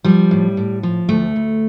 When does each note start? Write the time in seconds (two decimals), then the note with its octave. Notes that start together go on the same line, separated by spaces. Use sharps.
0.04 F3 G3
0.31 A2
0.57 A2
0.83 F3
1.09 D2 A3
1.36 D2